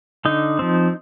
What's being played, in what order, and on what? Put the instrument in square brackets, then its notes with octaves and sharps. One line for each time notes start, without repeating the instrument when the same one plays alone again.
[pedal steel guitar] D3 D#4
F3 C4